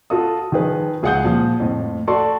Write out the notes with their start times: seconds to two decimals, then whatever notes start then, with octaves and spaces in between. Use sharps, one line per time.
0.10 F4 F#4 A4 F5 D#6
0.52 D#3 F3 G#4 B4
1.03 C#2 G#4 F5 F#5 D#6 G6
1.24 A#2 F3
1.60 F2 A2
2.07 F#4 A4 D5 C6 C#6